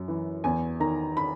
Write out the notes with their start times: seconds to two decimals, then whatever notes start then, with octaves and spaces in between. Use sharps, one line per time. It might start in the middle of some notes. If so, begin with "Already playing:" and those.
Already playing: F#2
0.08 E3
0.44 E2 G#5
0.80 D#3 A#5
1.17 B5